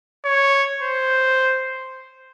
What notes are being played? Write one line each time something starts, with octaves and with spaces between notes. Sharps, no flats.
C#5
C5